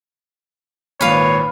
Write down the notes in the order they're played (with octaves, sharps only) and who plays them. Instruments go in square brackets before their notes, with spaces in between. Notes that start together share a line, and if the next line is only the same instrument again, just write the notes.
[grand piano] G#1 A#2 [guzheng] B4 F5 [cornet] C#5